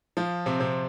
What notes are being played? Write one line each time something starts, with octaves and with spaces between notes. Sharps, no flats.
F3 F4
C3 C4
C3 C4